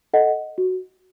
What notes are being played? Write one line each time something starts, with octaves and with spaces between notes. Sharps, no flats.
A4 D#5 F#5
F#4